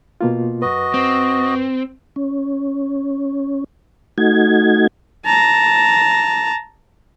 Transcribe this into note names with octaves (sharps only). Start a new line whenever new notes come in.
B2 A#3 F4
F#2 F#4 B4 D#5
C4
C#4
A3 D#4 F#4 G#6
A5 A#5